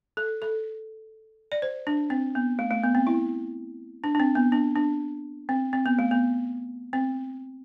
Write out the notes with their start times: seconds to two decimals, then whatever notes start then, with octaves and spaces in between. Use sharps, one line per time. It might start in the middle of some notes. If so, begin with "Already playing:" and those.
0.17 A4
0.42 A4
1.52 D5
1.62 C5
1.87 D4
2.10 C4
2.35 B3
2.59 A3
2.71 A3
2.84 B3
2.95 C4
3.07 E4
4.04 D4
4.15 D4
4.20 C4
4.35 B3
4.52 D4
4.76 D4
5.49 C4
5.73 C4
5.86 B3
5.99 A3
6.11 B3
6.93 C4